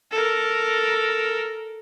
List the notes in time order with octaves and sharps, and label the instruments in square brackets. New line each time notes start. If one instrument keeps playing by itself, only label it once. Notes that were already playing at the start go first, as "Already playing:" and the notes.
[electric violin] A4 A#4